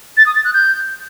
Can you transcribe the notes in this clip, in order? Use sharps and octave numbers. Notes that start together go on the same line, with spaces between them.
A6
D#6
A6
F#6
G6